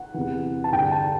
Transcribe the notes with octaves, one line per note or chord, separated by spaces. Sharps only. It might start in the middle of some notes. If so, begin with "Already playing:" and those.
Already playing: F#5
E2 C3 E3
A5
G2 D3 G5
A5